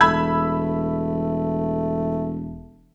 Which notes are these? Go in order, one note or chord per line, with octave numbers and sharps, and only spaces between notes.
E1 A3 B5 E6 G#6